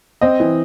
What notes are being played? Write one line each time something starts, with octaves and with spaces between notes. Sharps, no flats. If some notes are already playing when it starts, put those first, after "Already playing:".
C4 D#5
E3